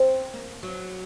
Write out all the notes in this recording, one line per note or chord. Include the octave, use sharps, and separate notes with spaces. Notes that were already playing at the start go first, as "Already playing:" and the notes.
Already playing: C4
A#3
F#3